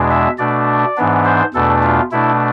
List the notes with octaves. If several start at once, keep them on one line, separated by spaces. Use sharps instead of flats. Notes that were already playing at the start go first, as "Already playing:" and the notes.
Already playing: E2 B2 G#3 D4
E5
B2 A3 D4 D5
G#2 E3 B3 D4
C5
E2 B2 A3 D4 A4
F4
B2 A3 D4 E4